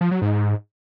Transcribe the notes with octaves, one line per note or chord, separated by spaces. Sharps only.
F3
F#3
G#2